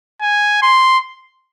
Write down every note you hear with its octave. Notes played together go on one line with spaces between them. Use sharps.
G#5
C6